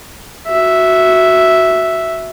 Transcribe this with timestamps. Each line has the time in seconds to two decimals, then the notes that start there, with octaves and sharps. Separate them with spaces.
0.48 F#4 E5